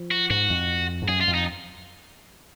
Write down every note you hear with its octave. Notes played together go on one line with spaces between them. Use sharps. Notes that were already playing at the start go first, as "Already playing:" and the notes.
Already playing: F3
F#4
G#2 F#4
F2
G#2
F#2 G#4
F4
F2
D#4